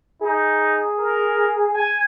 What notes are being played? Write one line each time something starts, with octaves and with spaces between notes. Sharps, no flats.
D#4 G#4
A#4
G#5